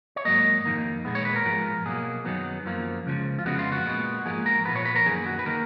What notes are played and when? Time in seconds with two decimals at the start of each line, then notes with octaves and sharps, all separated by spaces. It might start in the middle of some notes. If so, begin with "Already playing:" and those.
0.16 C#5
0.25 G#2 F#3 A#3 D#5
0.65 F2 D#3 A#3
1.05 A#2 G#3 B3
1.15 C#5
1.25 B4
1.36 A#4
1.45 G#2 F3 G#3
1.85 B2 F#3 A#3 G#4
2.25 F#2 D#3 F#3 B3
2.65 F#2 F3 A#3
3.06 C#2 C#3 F3
3.39 F4
3.45 F2 C#3 G#3 B3 F#4
3.59 F4
3.72 F#4
3.86 A#2 G#3 B3
4.26 G#2 F3 A#3 G#4
4.46 A#4
4.65 A#2 F3 B3 B4
4.76 C#5
4.85 B4
4.96 A#4
5.05 F#2 D#3 A#3 G#4
5.26 F#4
5.39 B4
5.46 D#3 A#3 A#4